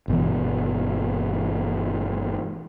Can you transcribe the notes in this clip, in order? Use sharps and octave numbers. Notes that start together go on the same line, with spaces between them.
G1 B2 E3